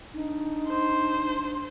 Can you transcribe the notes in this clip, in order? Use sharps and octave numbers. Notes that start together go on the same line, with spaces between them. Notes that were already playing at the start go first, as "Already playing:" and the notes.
D4 D#4
C5